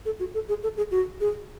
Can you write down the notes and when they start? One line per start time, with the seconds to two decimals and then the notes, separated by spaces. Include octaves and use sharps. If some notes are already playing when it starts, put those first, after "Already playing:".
0.06 A4
0.20 F#4
0.34 A4
0.49 G#4
0.63 A4
0.77 G#4
0.91 F#4
1.21 G#4